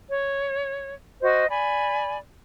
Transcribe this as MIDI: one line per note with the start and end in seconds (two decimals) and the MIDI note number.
0.09 0.95 73
1.21 1.46 66
1.21 1.46 72
1.21 1.46 75
1.49 2.17 74
1.49 2.17 80
1.49 2.17 83